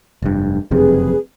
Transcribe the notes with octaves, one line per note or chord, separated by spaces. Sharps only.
F1 G2
F#1 F2 C3 G#4 B4